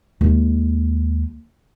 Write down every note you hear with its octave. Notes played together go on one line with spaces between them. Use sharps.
D#2 G#3